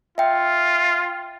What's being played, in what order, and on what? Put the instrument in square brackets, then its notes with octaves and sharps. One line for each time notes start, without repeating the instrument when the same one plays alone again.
[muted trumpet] F4 [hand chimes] E5 G5